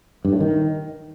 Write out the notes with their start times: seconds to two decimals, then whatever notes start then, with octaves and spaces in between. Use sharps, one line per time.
0.25 G2
0.33 A2
0.40 D#3